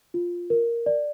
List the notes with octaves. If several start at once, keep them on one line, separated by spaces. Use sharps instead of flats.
F4
A#4
D5